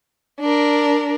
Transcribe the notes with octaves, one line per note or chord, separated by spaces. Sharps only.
D4 A#4